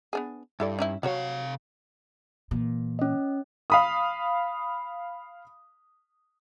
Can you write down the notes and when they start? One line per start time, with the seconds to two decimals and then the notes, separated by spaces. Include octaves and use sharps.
0.13 B3 D4 G#4
0.60 G2 E4 A4 D5
0.79 C#4 D#4 E4
1.03 C3 F#3 F#4 C#5 F5
2.51 A#2 E3
2.99 C#4 D#5
3.70 F5 B5 D#6